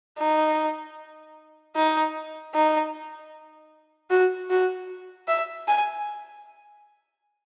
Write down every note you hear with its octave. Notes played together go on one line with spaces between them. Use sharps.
D#4
D#4
D#4
F#4
F#4
E5
G#5